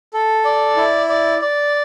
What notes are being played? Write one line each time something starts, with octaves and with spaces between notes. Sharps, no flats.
A4
D5
E4
D5
D5